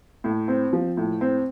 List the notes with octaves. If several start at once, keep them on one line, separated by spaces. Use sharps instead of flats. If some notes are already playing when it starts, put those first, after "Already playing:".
A2
C4
F3
A2
C4